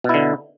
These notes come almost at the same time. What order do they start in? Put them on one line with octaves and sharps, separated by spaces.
B2 E4 D3